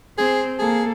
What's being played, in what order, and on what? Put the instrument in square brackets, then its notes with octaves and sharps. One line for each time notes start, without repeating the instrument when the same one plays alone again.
[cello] C4 [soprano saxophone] G#4
[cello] A#3 A4 [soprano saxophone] G#4